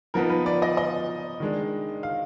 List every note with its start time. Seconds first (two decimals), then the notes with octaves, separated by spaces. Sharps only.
0.14 F3 B3 D#4 A#4
0.30 B4
0.46 D5
0.62 D#5
0.77 D#5
1.40 D#3 G#3 D4
2.03 F5